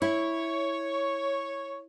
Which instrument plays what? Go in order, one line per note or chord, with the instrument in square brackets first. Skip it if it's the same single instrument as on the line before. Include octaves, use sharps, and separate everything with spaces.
[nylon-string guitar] E4 [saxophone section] C#5